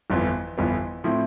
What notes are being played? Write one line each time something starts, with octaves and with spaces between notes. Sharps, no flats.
G1 F2 E3 B3
G1 F2 E3 B3
A2 F3 C4 E4